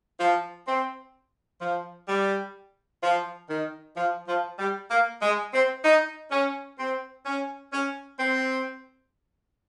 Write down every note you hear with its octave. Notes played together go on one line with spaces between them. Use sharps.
F3
C4
F3
G3
F3
D#3
F3
F3
G3
A#3
G#3
C4
D#4
C#4
C4
C#4
C#4
C4